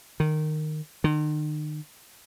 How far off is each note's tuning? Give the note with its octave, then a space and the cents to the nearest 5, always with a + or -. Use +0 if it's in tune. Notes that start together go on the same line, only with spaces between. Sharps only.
D#3 -15
D#3 -40